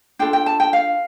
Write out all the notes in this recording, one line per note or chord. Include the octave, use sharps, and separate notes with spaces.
D4 F4 A4 G5
G5
A5
G5
F5